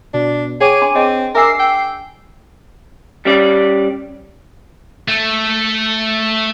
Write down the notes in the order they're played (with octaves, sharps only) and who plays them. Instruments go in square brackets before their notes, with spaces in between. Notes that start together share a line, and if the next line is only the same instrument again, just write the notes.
[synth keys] B2 [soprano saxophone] D4
[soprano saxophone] G#4 [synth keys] C#5 D6 D#7 [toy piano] G5
[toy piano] D4 G#5 C6
[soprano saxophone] C4 [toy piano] D4 G#4 D#5
[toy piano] D4 E5 G#5 [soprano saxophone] A#4 [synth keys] D6 E6 C7
[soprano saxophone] G5
[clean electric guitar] G3 C#4 G4 D5
[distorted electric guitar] A3